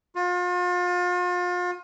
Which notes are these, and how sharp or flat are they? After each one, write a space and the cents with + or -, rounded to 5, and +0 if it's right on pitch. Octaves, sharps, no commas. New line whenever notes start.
F4 +35